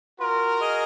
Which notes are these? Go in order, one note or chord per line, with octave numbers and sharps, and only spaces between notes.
F4 F#4 A#4
G#4 D#5 G#5